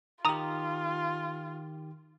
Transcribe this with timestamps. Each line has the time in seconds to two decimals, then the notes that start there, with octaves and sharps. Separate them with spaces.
0.25 D#3 F4 G4 A#5 D#6